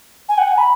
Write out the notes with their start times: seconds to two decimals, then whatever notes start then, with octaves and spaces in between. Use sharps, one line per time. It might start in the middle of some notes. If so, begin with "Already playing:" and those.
0.29 G#5
0.38 F#5
0.48 G#5
0.58 B5